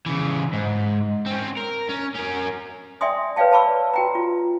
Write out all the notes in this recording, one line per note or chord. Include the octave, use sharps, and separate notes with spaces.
C#3 E3
G#2
C4 C#4
A#4
C#4
C#4 A#4
D5 E5 G5 G#5 C6 D#6
B4 C#5 D5 F5 G5 A5
B4 A5 B5 C#6 E6
F#4 G5 A#5
F4